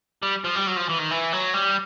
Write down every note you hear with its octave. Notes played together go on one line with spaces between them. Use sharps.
G3
F3
G3
F#3
F3
E3
D#3
E3
F#3
G3